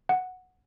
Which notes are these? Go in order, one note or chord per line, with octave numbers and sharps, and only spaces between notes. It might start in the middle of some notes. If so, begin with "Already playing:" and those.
F#5